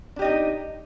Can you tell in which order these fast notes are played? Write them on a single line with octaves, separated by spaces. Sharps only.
D4 G4 D#5 D#4